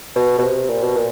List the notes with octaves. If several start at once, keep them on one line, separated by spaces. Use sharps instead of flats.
B2
B2
C3
A#2
B2
A#2